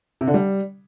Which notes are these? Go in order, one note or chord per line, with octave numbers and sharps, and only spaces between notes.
C3
D3
G3